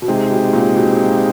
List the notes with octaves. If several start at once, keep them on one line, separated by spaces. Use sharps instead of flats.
B2
C3 G#3 C4 D#4 G4
B2
A#2
B2